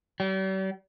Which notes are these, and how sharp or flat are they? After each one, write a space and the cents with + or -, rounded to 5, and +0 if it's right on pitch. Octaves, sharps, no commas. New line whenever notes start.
G3 -45